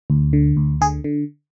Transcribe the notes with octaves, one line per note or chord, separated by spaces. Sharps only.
D2
D3
D2
D3 G#4
D3